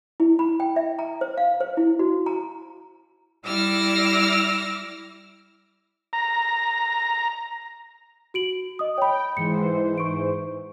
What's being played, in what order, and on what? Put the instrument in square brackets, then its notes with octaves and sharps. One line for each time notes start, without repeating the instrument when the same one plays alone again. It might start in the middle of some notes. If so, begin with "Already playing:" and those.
[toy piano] E4
B5
G5
E5
A#5
C5
F5
C5
E4
F#4
A#5
[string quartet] G3 E4 D6 E6 F6 A#6
[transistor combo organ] A#5
[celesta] F#4 D7 F#7
D#5 D#6
[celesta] C#5 B5 [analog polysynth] G5
[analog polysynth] G#2 E3 C5 [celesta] C#7
[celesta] C#6 D7